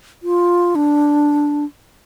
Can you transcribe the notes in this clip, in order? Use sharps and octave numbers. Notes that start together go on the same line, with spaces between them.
F4
D4